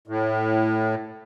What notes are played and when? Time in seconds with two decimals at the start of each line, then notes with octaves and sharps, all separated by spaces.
0.08 A2